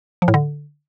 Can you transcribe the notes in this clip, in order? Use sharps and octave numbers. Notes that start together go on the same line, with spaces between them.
F3
A2
D3